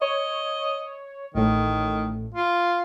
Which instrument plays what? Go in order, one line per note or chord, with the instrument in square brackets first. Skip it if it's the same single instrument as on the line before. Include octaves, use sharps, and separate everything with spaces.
[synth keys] C#5 [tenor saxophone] D#5
[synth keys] A1 A2 [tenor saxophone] D#3
[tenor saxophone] F4